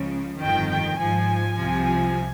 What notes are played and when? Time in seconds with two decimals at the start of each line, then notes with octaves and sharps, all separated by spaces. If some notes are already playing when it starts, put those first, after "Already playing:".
Already playing: C#2 C#3 F3
0.38 G1 F2 D#3 G5
0.68 G5
0.98 G#1 G#2 F3 G#5
1.58 C2 C3 F3